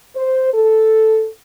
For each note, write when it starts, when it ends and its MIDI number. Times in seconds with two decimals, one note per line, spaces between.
0.16 0.50 72
0.53 1.26 69